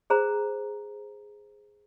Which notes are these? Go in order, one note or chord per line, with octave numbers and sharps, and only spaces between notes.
G#4 C5 A#5